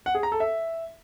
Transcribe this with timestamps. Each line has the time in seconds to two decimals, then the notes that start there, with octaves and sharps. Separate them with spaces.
0.06 F#5
0.15 G#4
0.23 A#5
0.32 A4
0.40 E5